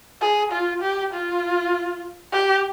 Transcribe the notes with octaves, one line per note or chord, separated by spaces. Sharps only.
G#4
F4
G4
F4
G4